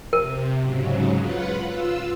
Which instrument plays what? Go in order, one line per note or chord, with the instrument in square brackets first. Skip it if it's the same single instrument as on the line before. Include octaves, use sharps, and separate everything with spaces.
[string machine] C3 [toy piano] A#4
[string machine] G#2 C#3 F#3
F4 B4 F#5
F4 E6